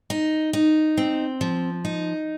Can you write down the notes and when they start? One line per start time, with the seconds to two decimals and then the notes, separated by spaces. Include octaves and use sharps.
0.10 D#4
0.53 D#4
0.98 C4
1.41 F3
1.85 D#4